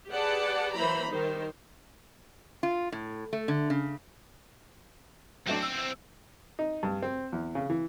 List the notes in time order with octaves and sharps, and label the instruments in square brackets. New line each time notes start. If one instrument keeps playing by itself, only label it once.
[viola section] G4 G#4 B4 D5 F#5 A5
E3 F#3 A#3 C5 A#5 B5
D#3 G3 D#4 C5
[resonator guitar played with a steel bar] F4
A2
A3
D3
C#3
[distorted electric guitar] E2 C4 [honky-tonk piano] F#3 A3 D4
[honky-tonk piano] E6
[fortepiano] D#4
G2
C4
E2
C#3
E3